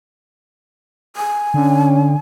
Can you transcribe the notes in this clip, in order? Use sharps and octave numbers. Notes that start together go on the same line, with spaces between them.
G#5
D3 C#4